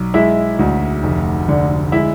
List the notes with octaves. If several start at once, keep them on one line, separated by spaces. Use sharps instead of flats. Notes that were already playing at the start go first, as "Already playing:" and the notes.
Already playing: B1
G#3 E4 E5
D2
F1
D3
G#3 E4 E5